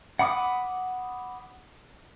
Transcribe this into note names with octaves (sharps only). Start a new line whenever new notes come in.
F#5 B5 D6 D#6